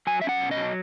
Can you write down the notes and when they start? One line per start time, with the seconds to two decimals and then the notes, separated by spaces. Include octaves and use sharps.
0.07 F#3 G#5
0.21 C#4 E5
0.29 F#5
0.40 B2
0.51 D#5
0.57 F#3